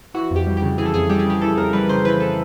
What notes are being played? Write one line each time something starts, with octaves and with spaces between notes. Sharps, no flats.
E3 F#4
F2
G4
G3
G4
C#3
E3 G#4
A4
F2 G#4
G3 G4
G#4
C#3 G4
E3 A4
F2 A#4
G3 B4
C#3 C5
E3 B4
A4